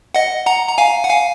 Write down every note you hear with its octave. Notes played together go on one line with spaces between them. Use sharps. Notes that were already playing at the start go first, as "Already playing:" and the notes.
D#5 F#5
F#5 A#5
A#5
F5 G#5
F#5
F5 G#5